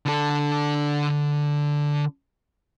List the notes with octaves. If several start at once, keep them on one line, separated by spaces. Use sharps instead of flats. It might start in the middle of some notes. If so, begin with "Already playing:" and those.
D3 A4